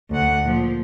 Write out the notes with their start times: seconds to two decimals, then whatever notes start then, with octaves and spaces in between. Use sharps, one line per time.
0.10 D2 F#5
0.45 A#2 F3